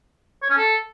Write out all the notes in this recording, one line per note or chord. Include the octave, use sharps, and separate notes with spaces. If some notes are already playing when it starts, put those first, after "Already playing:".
C#5
C#4
A4